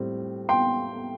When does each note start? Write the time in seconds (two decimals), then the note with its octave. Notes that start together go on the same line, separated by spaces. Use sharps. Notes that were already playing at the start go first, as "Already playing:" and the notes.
Already playing: A2 G3 C4
0.49 G5 C6